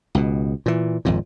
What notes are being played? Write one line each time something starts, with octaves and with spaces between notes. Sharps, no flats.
C#2 B2
A#2 E3
G#1 F2 A#2